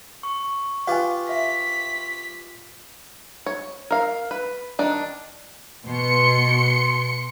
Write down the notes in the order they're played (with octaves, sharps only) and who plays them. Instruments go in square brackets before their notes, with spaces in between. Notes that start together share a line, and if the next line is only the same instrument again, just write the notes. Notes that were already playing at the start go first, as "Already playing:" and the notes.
[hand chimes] C#6
[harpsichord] F4 G4 B4 [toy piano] F5 G#5
[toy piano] E5 F5 [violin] B6
[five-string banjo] C#5
A#4 F5
B4
D#3 D4
[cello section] B2 [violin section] C6 C#7